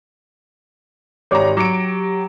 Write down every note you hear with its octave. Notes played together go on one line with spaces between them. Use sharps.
G#1 G4 C#5 D5 A#5 D6
F#3 D6 C#7 D7